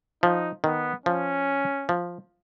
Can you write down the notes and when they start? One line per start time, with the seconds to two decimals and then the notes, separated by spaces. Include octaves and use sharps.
0.23 F3 D#4
0.64 D#3 B3
1.06 F3 C#4
1.89 F3